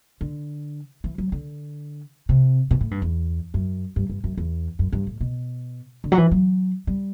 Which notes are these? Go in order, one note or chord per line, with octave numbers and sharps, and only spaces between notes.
D3
E3
F#3
D3
C3
B2
A2
G2
E2
F#2
G2
G2
F#2
E2
F#2
G2
A2
B2
D3
F#3
E3
F#3
G3